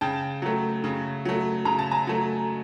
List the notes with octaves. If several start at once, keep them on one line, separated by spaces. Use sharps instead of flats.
C#3 G5 A5
F#3 A3
C#3
F#3 A3
C#3 A#5
A5
G#5 A#5
F#3 A3